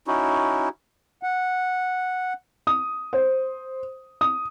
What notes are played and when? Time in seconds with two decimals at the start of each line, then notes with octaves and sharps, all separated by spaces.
0.07 C#4 D#4 E4 F#4
1.23 F#5
2.67 D#6
3.13 C5
4.21 D#6